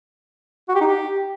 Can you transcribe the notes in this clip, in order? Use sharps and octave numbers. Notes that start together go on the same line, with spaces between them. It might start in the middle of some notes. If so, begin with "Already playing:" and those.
F#4
G4
D#4
G4